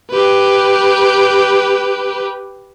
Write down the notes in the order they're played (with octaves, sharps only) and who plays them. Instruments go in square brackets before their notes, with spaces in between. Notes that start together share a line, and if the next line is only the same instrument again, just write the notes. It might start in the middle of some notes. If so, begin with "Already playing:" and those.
[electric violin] G4 B4